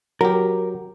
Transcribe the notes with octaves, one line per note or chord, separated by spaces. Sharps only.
F#3 G4 A#4